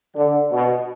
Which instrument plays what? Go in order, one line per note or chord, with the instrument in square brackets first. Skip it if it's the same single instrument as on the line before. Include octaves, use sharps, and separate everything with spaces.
[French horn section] D3
B2